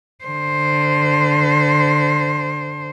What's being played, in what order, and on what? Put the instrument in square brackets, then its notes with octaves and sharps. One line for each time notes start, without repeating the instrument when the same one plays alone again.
[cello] D3 C5